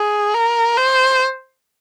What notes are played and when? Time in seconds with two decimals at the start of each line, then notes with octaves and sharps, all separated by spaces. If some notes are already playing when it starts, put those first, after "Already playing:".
Already playing: G#4
0.34 A#4
0.77 C5